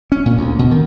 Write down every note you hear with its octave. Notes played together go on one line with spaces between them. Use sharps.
C#4
A#2
D2
B2
D#3